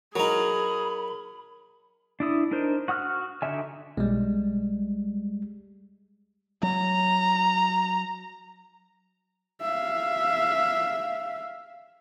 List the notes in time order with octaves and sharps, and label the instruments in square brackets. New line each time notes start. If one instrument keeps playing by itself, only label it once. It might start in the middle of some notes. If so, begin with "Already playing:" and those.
[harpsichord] F#3 D#4 [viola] G#4 [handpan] A#4 [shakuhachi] B5
[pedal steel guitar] D4 E4 D#6
D4 D#4 A#4 C5
F#4 F#5 D#6 F6 F#6
D3 D#4 F#4 E5 G#5
[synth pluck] B1 [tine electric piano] G3 G#3
[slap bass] F#3 [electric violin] A#5
[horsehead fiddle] E5 F5